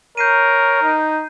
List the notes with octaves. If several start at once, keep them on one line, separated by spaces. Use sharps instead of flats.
A#4 C#5 G6 C7 D#7
D#4